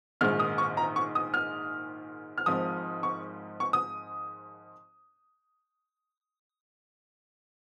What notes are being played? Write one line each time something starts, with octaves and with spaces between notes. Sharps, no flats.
A#1 G#2 D#3 G#3 F6
D#6
C#6
A#5
C#6
D#6
F6
F6
G#1 G#2 F3 D#6
C#6
C#6
D#6